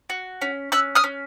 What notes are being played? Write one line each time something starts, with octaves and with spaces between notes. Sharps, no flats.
F#4
C#4
C#4 E6 F#6
D#6 F6
C#4